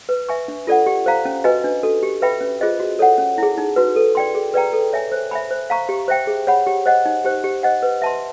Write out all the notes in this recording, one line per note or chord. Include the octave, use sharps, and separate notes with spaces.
B4
E5 G#5 C#6
D4
F4 A4 D5 F#5
G4
C5 F5 A#5
C#4
F#4 B4 D#5 G#5
D4
F#4 A4
G4
B4 E5 G5 B5
C#4
F4 G#4 C5 D#5
F#4
A4 C#5 F#5
C#4
E4 G#4
D#4
F#4 B4
A4
D5 G5 C6
G#4
B4 D5 G5 A#5
A4
C#5 E5 G#5
C5
E5 G#5 B5
C5
F5 A#5 C#6
G4
C5 E5 G5
G#4
C#5 F#5 B5
G4
C5 D#5 F#5
D#4
G4 C5
G4
C5 D#5 F#5
B4
E5 A5 C6